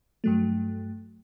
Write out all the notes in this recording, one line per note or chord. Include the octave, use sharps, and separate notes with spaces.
G2 F#3 A3